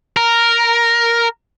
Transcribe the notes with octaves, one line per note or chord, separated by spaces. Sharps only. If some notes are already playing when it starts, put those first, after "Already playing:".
A#4